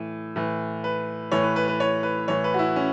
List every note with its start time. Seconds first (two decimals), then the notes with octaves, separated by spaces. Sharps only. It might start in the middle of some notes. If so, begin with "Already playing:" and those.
Already playing: A2 E3
0.36 A2 E3
0.84 B4
1.32 A2 E3 C#5
1.43 B4
1.56 B4
1.68 B4
1.80 C#5
2.03 B4
2.28 A2 E3 C#5
2.44 B4
2.54 F#4
2.59 E4
2.76 C#4